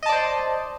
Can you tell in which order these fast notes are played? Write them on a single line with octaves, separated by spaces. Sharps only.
D#5 A5 D5 C5